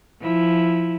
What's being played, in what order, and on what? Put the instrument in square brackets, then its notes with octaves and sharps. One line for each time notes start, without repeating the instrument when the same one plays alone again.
[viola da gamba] F3 E4